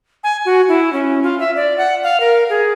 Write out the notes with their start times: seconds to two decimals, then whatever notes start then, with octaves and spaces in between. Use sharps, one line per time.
0.24 G#5
0.46 F#4
0.69 E4
0.93 C#4
1.23 F4
1.40 E5
1.56 D5
1.78 F#5
2.03 F5
2.20 A#4
2.50 G#4